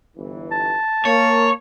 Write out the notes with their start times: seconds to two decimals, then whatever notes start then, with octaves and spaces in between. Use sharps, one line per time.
0.17 G1 E3
0.51 A5
1.05 A#3 C#5